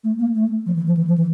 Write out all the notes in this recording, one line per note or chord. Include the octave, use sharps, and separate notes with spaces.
A3
A#3
A3
F3
E3
F3
E3
F3
E3